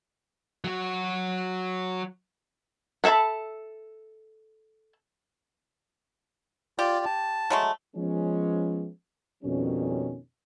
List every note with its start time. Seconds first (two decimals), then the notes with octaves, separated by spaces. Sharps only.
0.64 F#3 F#4
3.04 B3 A4 E5 A5 B5
6.79 F4 G4 D5
7.05 A5
7.50 F#3 G#3 A3
7.96 F3 G#3 B3 C#4
9.44 F2 B2 D#3 G3 C#4